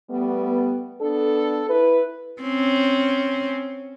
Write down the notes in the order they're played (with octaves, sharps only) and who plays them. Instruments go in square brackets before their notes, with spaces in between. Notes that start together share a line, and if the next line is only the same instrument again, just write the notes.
[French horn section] G3 A3 B3
B3 D4 A4
E4 B4
[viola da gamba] C4 C#4